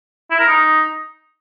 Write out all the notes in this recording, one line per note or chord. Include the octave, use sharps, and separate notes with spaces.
E4
A#4
D#4